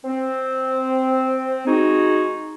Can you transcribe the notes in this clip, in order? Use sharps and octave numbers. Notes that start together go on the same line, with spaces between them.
C4
G#3 D#4 F#4 G#4